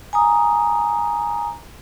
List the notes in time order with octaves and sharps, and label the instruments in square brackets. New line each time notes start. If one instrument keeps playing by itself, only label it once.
[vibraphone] G#5 A#5 D#6